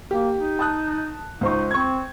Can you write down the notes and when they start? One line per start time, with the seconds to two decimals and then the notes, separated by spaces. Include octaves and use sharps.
0.11 A#3 G4
0.36 D#4
0.59 A5 D#6 F#6
1.41 C#2 D#4 C5 C#6
1.71 C4 C#6 G#6